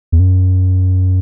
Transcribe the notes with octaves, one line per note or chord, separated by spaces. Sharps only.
E2
F#2